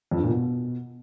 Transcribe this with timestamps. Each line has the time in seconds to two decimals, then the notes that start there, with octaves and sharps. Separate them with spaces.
0.11 F2
0.18 G2
0.24 A#2
0.30 B2